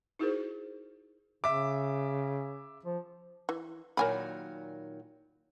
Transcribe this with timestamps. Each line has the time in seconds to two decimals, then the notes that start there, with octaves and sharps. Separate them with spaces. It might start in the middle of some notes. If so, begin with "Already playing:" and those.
0.19 D#4 E4 F#4 G#4 A#4 C5
1.44 C#3 E5 D6
2.85 F3
3.49 E3
3.97 A#2 D#3 F#3 A#4 G#5 B5